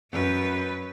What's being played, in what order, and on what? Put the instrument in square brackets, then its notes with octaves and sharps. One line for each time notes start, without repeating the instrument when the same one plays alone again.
[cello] F#2 B4